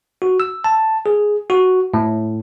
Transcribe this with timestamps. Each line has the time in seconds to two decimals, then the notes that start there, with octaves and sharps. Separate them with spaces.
0.22 F#4
0.40 E6
0.64 A5
1.06 G#4
1.50 F#4
1.94 A2